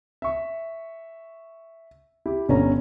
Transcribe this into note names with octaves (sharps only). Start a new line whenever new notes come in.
E5 C#6
E4 G4
G1 D3 C#4 A#5